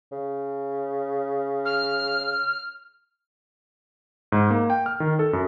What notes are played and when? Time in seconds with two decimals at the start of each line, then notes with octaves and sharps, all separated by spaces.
0.12 C#3
1.65 F6
4.32 G#2
4.50 A#3
4.70 G5
4.86 F6
5.00 D#3
5.19 A4
5.33 F#2